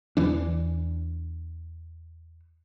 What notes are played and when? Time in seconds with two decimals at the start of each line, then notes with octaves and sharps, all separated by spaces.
0.17 E2 E3 D4